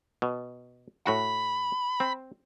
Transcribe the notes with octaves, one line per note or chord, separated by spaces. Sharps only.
B2
A2 F#4 B5
C4